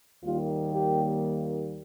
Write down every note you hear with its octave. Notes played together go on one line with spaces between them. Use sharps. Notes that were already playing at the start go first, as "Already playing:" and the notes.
D#2 D#3 G3 A#3 F4
G4